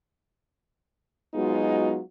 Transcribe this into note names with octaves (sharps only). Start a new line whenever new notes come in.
F#3 G#3 B3 D#4 F4 F#4